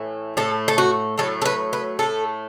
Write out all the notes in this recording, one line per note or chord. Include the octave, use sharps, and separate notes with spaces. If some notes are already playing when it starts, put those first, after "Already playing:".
Already playing: A2 E3 A3
A2 A3 A4
A4
F#4
A2 F#3 A3 A4
A4
B4
B4
A2 A3 A4